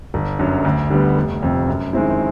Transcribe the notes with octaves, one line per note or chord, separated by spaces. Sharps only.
G1
F#2 D3 F#3
D2
D3 G3 B3
F1
F2 C3
F#2
D#3 G#3 C4 E4